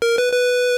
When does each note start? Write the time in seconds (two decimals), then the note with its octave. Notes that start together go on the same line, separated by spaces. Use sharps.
0.02 A#4
0.18 B4
0.33 B4